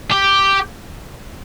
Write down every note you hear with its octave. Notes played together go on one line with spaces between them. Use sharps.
G4